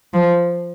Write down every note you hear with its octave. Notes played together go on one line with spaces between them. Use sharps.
F3